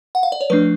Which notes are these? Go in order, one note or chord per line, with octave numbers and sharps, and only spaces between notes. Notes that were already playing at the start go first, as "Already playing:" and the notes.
F#5
F5
D5
C#5
F3 A3 D4 B4